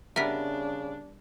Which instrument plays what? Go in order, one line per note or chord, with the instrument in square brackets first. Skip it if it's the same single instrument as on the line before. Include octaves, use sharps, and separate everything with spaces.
[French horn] C#3 [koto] G3 B3 A#4 [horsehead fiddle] D4 [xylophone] E5 B6